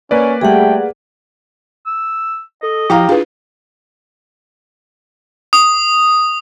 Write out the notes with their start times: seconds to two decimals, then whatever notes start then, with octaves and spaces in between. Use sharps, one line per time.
0.11 A#3 C#4 B4 D5
0.41 G3 A3 G#4 F#5 G5
1.86 E6
2.63 A4 D#5
2.90 F3 E4 G4 F5 A#5
3.09 D4 F4 G#4 B4
5.53 D#6